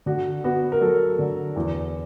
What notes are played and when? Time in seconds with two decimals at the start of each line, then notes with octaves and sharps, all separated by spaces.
0.06 D3 F#4
0.44 B3 F#4
0.72 A#4
0.81 F#3 A4
1.19 D3
1.56 E2